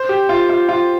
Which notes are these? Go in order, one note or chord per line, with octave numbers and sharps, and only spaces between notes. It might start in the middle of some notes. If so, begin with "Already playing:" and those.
Already playing: C5
G4
F4
F4
F4